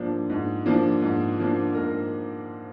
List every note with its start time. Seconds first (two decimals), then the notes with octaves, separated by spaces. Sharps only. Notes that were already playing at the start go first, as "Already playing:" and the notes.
Already playing: G#2 F3 A#3 D4
0.30 G#2
0.66 F3 A#3 D4
1.02 G#2
1.39 F3 A#3 D4
1.75 G#2 A#4